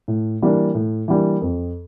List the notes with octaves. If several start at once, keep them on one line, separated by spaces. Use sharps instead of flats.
A2
E3 G3 A#3 D4
A2
E3 G3 A#3 D4
F2